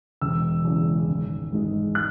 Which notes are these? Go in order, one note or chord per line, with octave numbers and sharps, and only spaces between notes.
E1 E6
E2 C#3 G#3
G#1
G#2 G#3
F#6